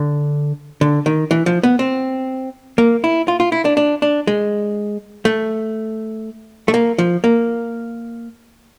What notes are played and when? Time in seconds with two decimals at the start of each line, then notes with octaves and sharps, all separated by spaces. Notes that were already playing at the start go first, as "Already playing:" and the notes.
Already playing: D3
0.81 D3
1.06 D#3
1.31 E3
1.46 F3
1.63 B3
1.79 C4
2.78 A#3
3.04 E4
3.28 F4
3.40 F4
3.52 E4
3.65 D4
3.77 D4
4.02 D4
4.27 G#3
5.25 A3
6.68 A3
6.74 A#3
6.99 F3
7.24 A#3